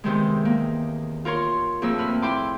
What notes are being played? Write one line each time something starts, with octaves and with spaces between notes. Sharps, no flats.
E2 C3 D#3 G#3
A#3
F4 A#4 C#5 C6
F2 A2 A#3 G#4 E6
C4 B4 F6
E4 G5 C6 D6